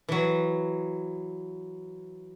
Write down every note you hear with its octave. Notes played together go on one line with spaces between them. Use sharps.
E3 F#3